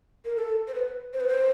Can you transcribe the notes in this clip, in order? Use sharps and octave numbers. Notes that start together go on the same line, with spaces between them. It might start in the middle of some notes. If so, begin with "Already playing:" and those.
A#4
A4
C5
B4
C5
B4
C5